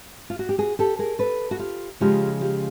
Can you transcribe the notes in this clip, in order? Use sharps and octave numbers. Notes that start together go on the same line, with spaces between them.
F4
F#4
G4
F#4 G#4
G4 A4
G#4 A#4
A4 B4
F#4
F4 G4
C#3 F3 G#3 F4 G4
F4 G4